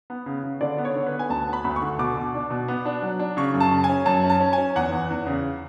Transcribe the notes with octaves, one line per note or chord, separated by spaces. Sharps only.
B3
C#3
C#3
D3 D5
B3
C#5
D3
B4
B3
G#5
D2 A5
B3
B5
D2 B5
C#6
D3
B2 D6
B2
D4
B2
B3
D4
F#3
D4
C#3 C#6
F#2
A5
C#3
G#5
C#4
F#2 A5
C#4
A5
C#4
G#5
C#4
E2 F#5
E2
E2
C#3